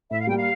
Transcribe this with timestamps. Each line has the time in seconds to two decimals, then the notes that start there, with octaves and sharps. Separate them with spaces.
0.10 A2 E5
0.19 F5
0.27 G3 A#3 G5
0.36 F5